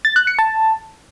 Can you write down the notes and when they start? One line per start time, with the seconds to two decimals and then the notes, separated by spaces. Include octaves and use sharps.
0.05 A6
0.16 F#6
0.27 C#7
0.39 A5